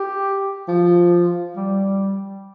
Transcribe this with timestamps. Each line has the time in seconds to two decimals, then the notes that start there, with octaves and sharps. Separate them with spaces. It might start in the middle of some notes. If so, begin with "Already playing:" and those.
Already playing: G4
0.68 F3
1.56 G3